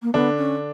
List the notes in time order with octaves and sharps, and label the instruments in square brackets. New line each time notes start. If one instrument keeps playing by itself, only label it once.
[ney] A#3
[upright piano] D3 D4 [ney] B3
[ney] C#4